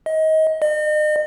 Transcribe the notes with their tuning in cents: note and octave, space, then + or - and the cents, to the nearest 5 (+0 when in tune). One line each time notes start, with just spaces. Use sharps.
D#5 +25
D#5 -40